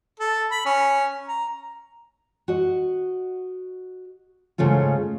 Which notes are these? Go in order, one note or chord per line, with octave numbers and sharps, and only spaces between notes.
A4
B5
C#4
A#5
F#4 D#5
G#2 C#3 A3 C#4 F4